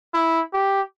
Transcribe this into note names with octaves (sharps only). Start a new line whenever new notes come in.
E4
G4